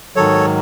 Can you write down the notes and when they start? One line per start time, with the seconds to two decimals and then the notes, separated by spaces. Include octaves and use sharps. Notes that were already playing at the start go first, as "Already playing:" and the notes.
0.16 G#2 D#3 F#3 A4 C#5